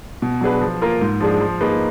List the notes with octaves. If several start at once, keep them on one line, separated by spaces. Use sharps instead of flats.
B2
F#3 D4 G#4 B4
F3
A#3 F4 A#4
G#2
F3 G#3 D4 G#4
F3
A#3 D#4 G#4 B4